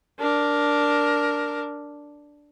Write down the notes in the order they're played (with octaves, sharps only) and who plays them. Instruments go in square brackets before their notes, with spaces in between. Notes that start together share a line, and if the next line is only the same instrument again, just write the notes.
[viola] D4 A#4